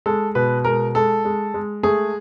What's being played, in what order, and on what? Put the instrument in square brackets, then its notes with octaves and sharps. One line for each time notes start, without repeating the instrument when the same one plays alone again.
[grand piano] G#3 A4
B2 B4
G#3 A#4
G#3 A4
G#3
G#3
A3 G#4